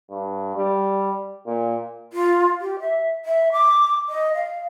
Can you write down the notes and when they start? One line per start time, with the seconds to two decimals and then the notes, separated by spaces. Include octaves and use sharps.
0.10 G2
0.56 G3
1.46 A#2
2.13 F4
2.60 G4
2.80 E5
3.25 E5
3.52 D6
4.09 D#5
4.34 F5